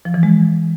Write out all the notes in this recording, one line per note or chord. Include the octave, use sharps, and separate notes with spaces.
F3
E3
G#3